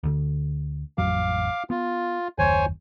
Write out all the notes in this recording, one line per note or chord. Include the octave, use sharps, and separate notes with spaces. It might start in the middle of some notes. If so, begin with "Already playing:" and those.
D2 D3
A1 F2 F#3 F5 D6
B3 F4
F#1 D#2 C5 C#5 G#5